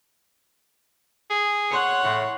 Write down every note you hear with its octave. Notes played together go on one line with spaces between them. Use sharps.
G#4
C#5 F#5 C6 C#7
A2 C6 C7 C#7